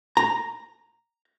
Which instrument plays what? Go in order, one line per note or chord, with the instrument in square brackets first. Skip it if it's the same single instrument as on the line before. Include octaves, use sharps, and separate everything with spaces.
[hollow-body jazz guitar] A#5